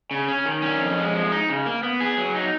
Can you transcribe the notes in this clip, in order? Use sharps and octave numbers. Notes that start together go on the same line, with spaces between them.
C#3
C#4
D#3
C#4
F2
G#3
F3
D#4
C#3
A#3
B3
G#4
F#3
D#4